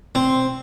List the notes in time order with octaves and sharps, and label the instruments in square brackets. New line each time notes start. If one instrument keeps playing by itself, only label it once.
[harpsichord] C4